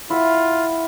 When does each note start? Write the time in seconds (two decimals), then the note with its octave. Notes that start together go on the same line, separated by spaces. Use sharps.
0.10 E4 F4 E5 F#5